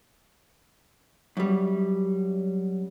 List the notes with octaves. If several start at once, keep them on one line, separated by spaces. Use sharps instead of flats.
F#2 G3